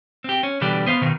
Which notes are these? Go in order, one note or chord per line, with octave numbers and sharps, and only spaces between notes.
C4 G4
C#4
B2 D3 E3 G3 G4 D5
B3 C5 D#5 F5
B2 D#3 D#4